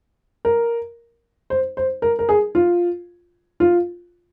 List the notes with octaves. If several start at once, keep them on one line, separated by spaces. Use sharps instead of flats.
A#4
C5
C5
A#4
A#4
G#4
F4
F4